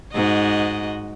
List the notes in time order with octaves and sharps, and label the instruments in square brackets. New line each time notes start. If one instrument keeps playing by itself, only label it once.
[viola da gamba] G#2 F#4 D#5